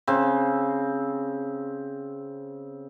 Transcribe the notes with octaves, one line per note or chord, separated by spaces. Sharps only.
C#3 C4